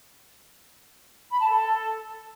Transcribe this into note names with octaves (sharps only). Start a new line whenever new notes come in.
B5
A5
A4